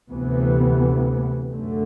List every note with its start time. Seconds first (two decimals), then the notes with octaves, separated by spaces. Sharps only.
0.10 D2 C3 E3 B3
1.51 F#2 D3 A3